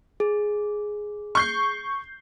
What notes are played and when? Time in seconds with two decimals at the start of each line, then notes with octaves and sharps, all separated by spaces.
0.20 G#4
1.35 C#6 G6 C7